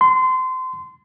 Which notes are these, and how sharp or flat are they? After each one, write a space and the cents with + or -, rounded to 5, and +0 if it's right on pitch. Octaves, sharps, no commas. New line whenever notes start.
C6 -25